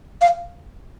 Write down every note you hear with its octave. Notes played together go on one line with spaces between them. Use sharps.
F5